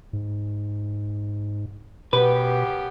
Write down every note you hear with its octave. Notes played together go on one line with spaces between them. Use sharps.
G#2
F#2 B2 B3 G4 B4